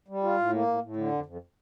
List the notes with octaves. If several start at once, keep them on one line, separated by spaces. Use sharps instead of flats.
G3
F4
A2
A#3
A2
A2
D3
F2
F2